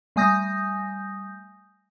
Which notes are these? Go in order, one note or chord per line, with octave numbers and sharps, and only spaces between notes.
G3 A3 G#5 D#6 G6 A#6